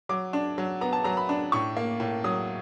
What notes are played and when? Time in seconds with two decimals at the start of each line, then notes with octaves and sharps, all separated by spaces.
0.09 F#3 D6
0.33 D4
0.58 F#3
0.81 B3 A#5
0.93 A5
1.04 F#3 A#5
1.17 B5
1.29 D4
1.52 A2 C#6
1.77 A#3
2.00 A2
2.24 F#3 D#6